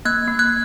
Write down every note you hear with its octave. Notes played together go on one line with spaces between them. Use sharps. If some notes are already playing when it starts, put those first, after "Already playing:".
A#3 F#6 G#6
A#3
F#6 G#6